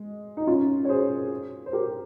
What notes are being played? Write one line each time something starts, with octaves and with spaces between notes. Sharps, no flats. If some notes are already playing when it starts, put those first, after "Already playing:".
Already playing: G#3
D#4
C#4 F4
C#5
G#4 C5
C5
G4 A#4